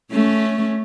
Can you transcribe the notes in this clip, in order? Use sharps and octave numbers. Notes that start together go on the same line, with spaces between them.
A3 C#4